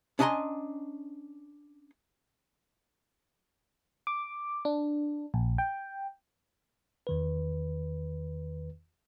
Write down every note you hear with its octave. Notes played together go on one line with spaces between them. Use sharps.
C#4 D4 D#5 G#5 A#5 C6
D6
D4
A#1
G5
E2 D#3 B4